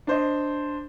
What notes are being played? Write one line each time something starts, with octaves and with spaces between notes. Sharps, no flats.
D4 C5 D#5